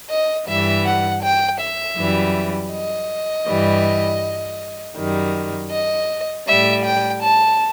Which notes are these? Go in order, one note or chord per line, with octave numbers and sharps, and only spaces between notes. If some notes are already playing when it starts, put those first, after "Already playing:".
D#5
G2 E3 G3 E5
F#5
G5
E5
F#2 E3 G3
D#5
G2 E3 G3
F#2 D#3 G3
D#5
A2 G3 E5
G5
A5